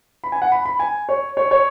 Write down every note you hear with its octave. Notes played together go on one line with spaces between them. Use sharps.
B5
G#5
F#5
B5
B5
G#5
C#5
C#5
C#5